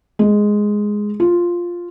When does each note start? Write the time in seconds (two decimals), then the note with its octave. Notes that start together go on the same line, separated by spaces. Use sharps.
0.19 G#3
1.20 F4